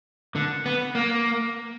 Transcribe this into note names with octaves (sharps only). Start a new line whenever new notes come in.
D3
B3
A#3